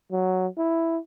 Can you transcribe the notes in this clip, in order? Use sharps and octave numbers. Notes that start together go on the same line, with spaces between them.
F#3
E4